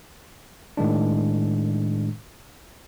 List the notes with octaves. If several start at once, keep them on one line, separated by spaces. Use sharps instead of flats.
A2 D#3 G#3 D4